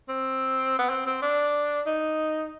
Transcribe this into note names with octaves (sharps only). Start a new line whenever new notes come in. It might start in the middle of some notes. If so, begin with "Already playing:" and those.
C4
B3
C4
C4
D4
D#4